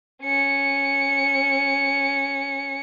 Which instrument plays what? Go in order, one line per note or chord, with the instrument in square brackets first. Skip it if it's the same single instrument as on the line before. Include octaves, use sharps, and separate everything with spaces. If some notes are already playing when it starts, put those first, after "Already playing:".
[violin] C#4 C#7